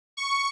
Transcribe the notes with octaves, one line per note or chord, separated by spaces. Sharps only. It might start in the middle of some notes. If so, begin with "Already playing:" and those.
C#6